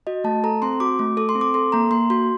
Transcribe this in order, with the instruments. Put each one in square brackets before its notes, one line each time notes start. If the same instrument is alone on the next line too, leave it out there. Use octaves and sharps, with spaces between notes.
[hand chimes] F#4 D#5
A3 A5
A4 A#5
C4 C6
F#4 D6
A3
A4 D6
C6
C4
D6
A4 C6
A#3 A#5
A#3 C6
F#4 C6